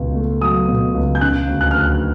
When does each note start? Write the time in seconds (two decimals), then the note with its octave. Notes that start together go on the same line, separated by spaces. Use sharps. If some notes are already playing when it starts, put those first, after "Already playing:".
Already playing: C#2 B2
0.15 A3
0.41 F#3 D#6
0.68 B2
0.94 C#2
1.15 G6
1.21 C#3 F#6
1.47 D2
1.61 F#6
1.71 D2 F6
1.80 F#6